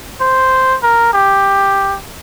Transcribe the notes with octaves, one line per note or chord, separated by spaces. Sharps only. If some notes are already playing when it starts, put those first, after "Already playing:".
C5
A#4
G4